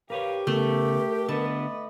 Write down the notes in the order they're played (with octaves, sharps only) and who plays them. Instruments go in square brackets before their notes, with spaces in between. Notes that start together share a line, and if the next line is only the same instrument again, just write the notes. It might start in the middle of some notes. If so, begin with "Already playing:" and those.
[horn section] G4 [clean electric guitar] A#4 B4 C#5 [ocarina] F5
[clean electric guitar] C#3 B3 [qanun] A3 [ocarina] A#4
[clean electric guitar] D3 B3 [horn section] B4 D5 D#5 [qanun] A5